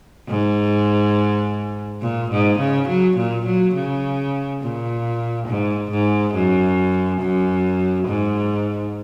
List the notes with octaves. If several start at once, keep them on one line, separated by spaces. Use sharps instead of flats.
G#2
A#2
G#2
C#3
F#3
A#2
F#3
C#3
A#2
G#2
G#2
F#2
F#2
G#2